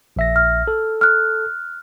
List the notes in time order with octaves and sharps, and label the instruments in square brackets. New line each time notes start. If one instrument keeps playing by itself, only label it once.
[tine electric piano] A#1 E5 A#6
[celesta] F6
[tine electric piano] A4
[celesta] F6 F#6